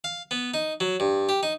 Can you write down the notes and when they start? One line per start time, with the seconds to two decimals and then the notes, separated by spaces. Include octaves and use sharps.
0.04 F5
0.31 B3
0.54 D#4
0.80 F#3
1.00 G2
1.29 G4
1.43 D#4